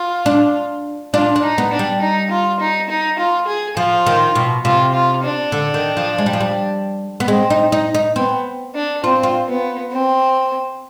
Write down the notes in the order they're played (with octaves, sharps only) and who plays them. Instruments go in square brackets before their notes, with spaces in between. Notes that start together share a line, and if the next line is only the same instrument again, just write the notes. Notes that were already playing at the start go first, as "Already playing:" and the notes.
Already playing: [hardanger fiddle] F4
[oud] D4
[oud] D4 [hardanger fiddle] F4
[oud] D4
[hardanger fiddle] D#4
[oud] B3
[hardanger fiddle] D4
[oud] G3
[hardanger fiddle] D#4
F4
D#4
D#4
F4
G#4
[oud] F3 [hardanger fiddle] F4
[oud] D#3
B2
[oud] C3 [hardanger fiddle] F4
[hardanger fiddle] F4
D4
[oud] D3
D#3
F3
G#3
G3
F3
G3
B3
[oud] G#3 [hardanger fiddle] C4
[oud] D#4
D#4
D#4
[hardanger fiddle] B3 [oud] C4
[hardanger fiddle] D4
[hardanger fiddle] C4 [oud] F4
[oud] F4
[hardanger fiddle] B3
C4